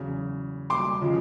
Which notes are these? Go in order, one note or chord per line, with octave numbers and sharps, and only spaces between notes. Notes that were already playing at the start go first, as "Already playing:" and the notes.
Already playing: E2 C#3 F#3
C6 D6
C#3 F3 G#3